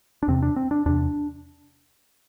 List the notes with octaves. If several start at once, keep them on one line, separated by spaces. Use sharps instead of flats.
D4
E2 C3 C4
D4
C4
D4
E2 C3 D4